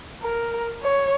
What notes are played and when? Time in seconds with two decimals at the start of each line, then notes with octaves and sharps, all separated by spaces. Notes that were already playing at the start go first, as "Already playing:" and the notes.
0.23 A#4
0.83 C#5